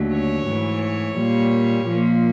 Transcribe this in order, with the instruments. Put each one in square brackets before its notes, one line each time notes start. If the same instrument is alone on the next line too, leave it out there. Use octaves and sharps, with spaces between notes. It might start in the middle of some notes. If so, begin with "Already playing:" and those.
Already playing: [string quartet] D#2 D3 F#3 A3
C#5
G#2 E3 A3
C#5
A#2 G3 A#3
A#2 F3 A#3